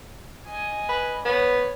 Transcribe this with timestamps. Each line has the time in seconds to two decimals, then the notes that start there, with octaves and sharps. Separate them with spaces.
0.45 D#5 G#5
0.89 B4
1.25 B3 C#5